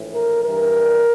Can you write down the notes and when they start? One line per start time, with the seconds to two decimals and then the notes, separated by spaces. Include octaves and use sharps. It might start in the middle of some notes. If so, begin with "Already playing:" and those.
Already playing: A#1 A2 E3
0.14 A#4
0.44 G2 E3 G3 A#4